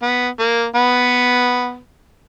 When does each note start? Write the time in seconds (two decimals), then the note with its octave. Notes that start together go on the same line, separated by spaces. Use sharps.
0.02 B3
0.39 A#3
0.75 B3